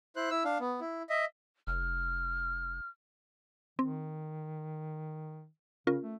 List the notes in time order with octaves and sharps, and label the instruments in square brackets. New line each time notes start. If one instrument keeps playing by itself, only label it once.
[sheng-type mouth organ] E4 C5 F#6
E4 E6
D4 F5
B3
E4
D#5 E5
[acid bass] F1 [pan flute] F6
[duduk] D#3 [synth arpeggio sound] C4
[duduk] C#3 [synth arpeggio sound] C#4 F4 A#4
[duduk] A3